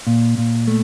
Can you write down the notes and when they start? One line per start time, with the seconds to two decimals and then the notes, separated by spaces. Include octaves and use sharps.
0.07 A#2
0.38 A#2
0.68 A3